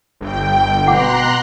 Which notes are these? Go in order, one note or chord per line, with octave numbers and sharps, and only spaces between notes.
G1 G5
B2 F#5 A#5 C6 D6 F#6